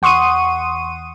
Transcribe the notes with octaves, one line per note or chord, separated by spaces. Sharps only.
E2 F#5 C6 C#6 D#6 D#7